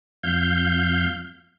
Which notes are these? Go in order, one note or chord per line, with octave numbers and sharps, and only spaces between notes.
F2 F5 G6